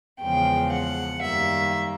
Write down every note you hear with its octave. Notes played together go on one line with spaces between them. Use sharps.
E2 C#3 F3 G#3 G5
F#5
F#2 D#3 G3 A#3 E5